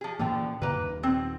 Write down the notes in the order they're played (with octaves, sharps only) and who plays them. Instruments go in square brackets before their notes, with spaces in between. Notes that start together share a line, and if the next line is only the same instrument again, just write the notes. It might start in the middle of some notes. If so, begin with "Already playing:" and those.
[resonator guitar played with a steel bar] F3 G#4
[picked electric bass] A#2 E3 A#3 [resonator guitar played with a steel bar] D3 F3 G5
[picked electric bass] F#2 C#3 [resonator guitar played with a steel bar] A#3 B4
[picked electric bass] D#1
[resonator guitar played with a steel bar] C4